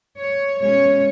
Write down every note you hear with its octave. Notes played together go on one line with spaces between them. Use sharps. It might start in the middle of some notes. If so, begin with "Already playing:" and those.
C#5
B2 G#3 C#4 C#5